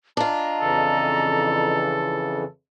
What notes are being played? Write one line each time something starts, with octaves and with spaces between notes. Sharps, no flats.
D4 F4 D#5 A#5
F2 C#3 E3 A4